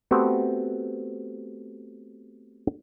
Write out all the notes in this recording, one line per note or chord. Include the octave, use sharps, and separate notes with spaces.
A3 B3 C4 F#4 G4